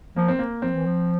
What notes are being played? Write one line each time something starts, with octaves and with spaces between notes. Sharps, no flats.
F3 A#3
C4
A#3
F3 C4
E3
F3